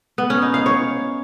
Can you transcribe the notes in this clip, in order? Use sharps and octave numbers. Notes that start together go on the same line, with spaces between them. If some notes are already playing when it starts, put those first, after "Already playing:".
B3
C#4
D#4
F5
C#5